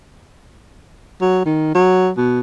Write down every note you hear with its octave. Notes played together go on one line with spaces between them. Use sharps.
F#3
D#3
F#3
B2